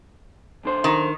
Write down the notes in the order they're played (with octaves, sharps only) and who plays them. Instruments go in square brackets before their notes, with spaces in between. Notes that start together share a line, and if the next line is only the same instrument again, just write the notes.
[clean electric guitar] B1 D3 C5
[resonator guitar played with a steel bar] D#3